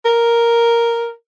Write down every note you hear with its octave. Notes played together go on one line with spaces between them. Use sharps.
A#4